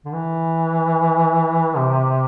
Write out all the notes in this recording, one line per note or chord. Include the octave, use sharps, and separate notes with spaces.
D3
E3
C3